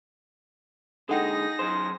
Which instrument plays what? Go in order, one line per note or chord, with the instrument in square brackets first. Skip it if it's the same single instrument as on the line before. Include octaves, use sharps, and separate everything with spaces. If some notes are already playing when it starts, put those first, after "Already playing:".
[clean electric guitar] D3 G#3 [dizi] D#4 [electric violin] G#4 A#6 [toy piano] A4 F#5 G5
[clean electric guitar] F#2 C5